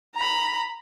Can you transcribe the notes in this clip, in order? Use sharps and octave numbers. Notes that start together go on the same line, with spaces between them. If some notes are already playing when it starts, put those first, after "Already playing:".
A#5 B5